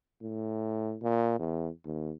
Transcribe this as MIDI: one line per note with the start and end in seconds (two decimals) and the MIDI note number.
0.22 0.97 45
1.02 1.35 46
1.39 1.69 40
1.85 2.13 39